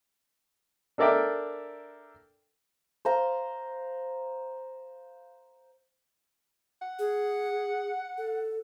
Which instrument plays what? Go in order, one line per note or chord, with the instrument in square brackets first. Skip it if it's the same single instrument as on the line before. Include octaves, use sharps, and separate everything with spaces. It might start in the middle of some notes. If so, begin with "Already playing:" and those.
[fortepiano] D4 A4 A#4 D5 E5 G5
[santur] C5 F5 A#5 C6
[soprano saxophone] F#5
[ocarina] G#4
A4